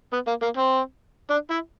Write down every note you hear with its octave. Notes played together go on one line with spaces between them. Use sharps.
B3
A#3
A#3
C4
D4
E4